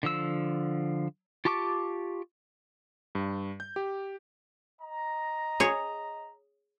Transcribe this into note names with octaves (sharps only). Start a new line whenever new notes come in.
D3 F3 E6
F4 G4 A5 C#6 D6
G2
G6
G4
D#5 A#5
G#4 C#5